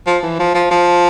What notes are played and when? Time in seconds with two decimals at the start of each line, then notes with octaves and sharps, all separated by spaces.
0.07 F3
0.23 E3
0.39 F3
0.55 F3
0.71 F3